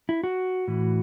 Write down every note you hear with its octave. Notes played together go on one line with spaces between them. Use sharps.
E4
F#4
A2 E3